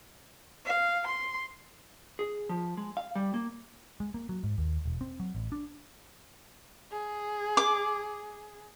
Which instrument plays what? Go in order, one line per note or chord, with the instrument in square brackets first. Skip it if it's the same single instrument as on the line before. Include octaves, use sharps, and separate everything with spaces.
[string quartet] F5
C6
[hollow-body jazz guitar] G#4
F3
G#3
F5
G3
A#3
[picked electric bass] G#3
A#3
F#3
G#2
D#2
E1
C4
F#3
A1
D4
[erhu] G#4
[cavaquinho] D6